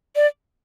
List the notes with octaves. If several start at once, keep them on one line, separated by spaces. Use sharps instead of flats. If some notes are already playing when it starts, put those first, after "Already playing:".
D5